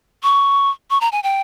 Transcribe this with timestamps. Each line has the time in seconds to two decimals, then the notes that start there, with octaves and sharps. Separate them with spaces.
0.23 C#6
0.90 C#6
1.01 A#5
1.12 G#5
1.23 G5